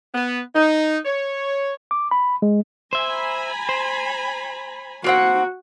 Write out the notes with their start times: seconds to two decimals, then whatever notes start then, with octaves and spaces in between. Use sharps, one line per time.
0.15 B3
0.56 D#4
1.05 C#5
1.91 D6
2.11 B5
2.42 G#3
2.93 C5 E5 G#5 A#5 B5
3.69 C5
5.04 A#3 C4 F#4 F#5